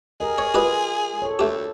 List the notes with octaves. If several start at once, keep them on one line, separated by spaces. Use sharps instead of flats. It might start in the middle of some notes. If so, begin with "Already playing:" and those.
G4 G#4 A#4 D#5
C#5
F4 G4 B4 D#5
A4 C#5
D2 A3 G4